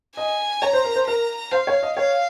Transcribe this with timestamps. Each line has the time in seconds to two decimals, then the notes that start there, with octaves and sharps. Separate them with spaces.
0.17 D#5 G#5
0.62 C#5 A#5
0.73 C5
0.85 A#4
0.95 C5
1.07 A#4 A#5
1.52 C5 F5
1.67 C#5
1.83 D#5
1.97 C#5 F5